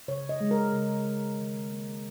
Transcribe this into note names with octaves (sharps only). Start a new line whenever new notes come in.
C#3 C#5
D#5
G#3
A#4
C#3
G#3
D#3
A#3